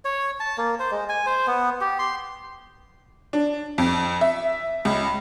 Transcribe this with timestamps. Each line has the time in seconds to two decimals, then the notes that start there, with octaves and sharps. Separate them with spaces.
0.05 C#5
0.40 A5
0.58 A#3
0.80 C5
0.91 G#3
1.09 G#5
1.26 C5
1.47 B3
1.81 G4
1.99 C6
3.33 D4
3.78 F2
4.21 E5
4.85 C#2